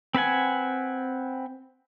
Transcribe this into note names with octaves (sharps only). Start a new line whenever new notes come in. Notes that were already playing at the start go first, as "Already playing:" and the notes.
C4 B4 F#5 G#5